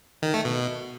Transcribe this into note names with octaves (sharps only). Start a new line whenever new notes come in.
D#3
A3
B2